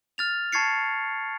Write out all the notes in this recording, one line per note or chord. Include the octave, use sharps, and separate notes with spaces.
F6 A6 F7
A5 C#6 G#6 A6 C7 C#7